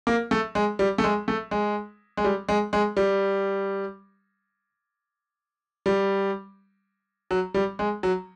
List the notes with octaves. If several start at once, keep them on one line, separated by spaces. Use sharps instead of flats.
A#3
A3
G#3
G3
A3
G#3
A3
G#3
G#3
G3
G#3
G#3
G3
G3
F#3
G3
G#3
F#3